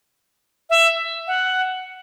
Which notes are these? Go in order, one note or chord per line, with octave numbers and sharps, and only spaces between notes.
E5
F#5